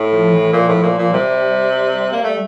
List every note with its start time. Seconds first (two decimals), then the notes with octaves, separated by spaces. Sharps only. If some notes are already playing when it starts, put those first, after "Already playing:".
Already playing: A2
0.12 F3
0.33 E3
0.52 A#2 F3
0.68 A2
0.83 A#2
0.98 A#2
1.13 C3 G3
2.13 A#3
2.24 A3